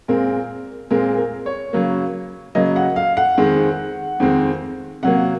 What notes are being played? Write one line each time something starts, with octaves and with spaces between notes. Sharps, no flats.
A#2 G#3 C4 A#4
A#2 G#3 C4 A#4
A#4
C#5
C#3 F#3 A#3
C#3 F#3 A#3 D#5
F#5
F5
F#5
F2 D#3 G#3 C4
F2 D#3 G#3 C4
C3 F#3 A#3 F#5